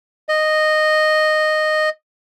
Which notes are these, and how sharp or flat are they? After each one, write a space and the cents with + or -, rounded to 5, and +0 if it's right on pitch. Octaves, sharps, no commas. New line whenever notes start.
D#5 -10